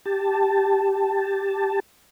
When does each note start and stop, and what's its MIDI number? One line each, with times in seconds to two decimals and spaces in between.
0.06 1.80 67
0.06 1.80 81